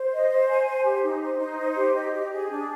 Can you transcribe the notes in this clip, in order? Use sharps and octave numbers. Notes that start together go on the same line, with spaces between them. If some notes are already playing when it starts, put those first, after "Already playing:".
Already playing: C5
D#5
C5
G#5
C5
G4
D#4
C5
D#4
C5
G4
D#5
G4
G#4
D4